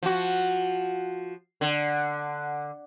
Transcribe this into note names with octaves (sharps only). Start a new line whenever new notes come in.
F3 F#4
D3